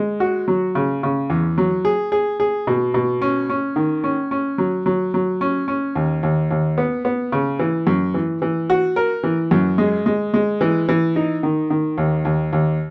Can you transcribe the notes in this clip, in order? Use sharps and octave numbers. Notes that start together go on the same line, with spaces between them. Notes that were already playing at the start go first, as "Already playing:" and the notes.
Already playing: G#3
F#4
F#3
C#3
C#3
E2
F#3
G#4
G#4
G#4
B2
B2
C#4
C#4
D#3
C#4
C#4
F#3
F#3
F#3
C#4
C#4
D#2
D#2
D#2
B3
B3
C#3
E3
F#2
E3
E3
F#4
A#4
E3
F#2
G#3
G#3
G#3
E3
E3
D#4
D#3
D#3
D#2
D#2
D#2